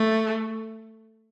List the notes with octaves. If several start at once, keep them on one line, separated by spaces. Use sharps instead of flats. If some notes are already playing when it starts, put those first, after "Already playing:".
Already playing: A3